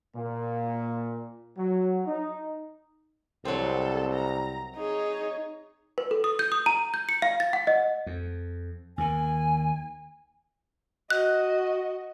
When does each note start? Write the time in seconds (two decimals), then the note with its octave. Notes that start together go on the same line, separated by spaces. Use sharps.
0.16 A#2
1.57 F#3
2.07 D#4
3.45 C2 F#3 C4 A4
4.13 A#5
4.76 D#4 G#4 C#5
5.98 B4
6.11 A4
6.24 D#6
6.39 G6
6.52 D#6
6.66 A#5
6.94 G6
7.09 C#7
7.22 F5
7.40 A6
7.53 F#5
7.67 D#5
8.06 F2
8.98 D#2 D#3 G#5
11.10 F#4 D#5 F#6